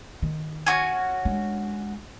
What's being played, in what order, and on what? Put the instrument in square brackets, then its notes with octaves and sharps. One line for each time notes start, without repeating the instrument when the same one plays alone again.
[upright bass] D#3
[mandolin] C#4 F#4 G#5
[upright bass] G#3 D4